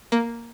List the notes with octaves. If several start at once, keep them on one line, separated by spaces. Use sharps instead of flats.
A#3